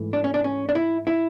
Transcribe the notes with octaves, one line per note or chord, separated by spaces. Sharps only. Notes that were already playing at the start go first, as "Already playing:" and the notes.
Already playing: G#2 E3 A3
D4
C#4
D4
C#4
D4
E4
E4